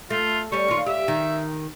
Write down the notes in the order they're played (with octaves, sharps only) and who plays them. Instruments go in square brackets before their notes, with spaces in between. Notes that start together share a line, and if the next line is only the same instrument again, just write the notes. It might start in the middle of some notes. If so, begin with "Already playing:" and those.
[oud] A3 [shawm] F4
[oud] G3 C#4 [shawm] C#6
[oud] D#2 F4
[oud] G4 [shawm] E5
[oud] D#3